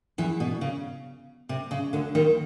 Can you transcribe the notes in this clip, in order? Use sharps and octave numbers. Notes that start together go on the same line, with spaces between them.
E2 E3
B2
C#3
C3
C#3
D2 D3
D#2 D#3